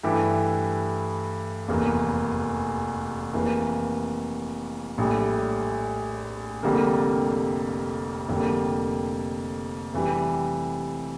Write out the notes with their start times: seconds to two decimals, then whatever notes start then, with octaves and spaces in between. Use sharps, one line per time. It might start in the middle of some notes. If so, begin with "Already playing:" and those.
0.03 G2 E3 A3 E4 G4
1.68 F1 E2 E3 A#3
3.33 F1 F2 E3 A#3
4.98 A#1 A2 G3
6.63 F1 F2 D3 G3 A#3
8.28 F1 F2 D3 G3 A#3
9.94 F1 F2 E3 G3